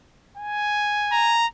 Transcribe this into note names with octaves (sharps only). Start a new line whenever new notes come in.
G#5
A#5